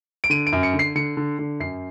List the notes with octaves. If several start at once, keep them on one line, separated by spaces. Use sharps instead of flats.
D7
D3 D#7
D7
F#2
C#7
D3
C7
D3 C#7
D3
D3
F#2 C7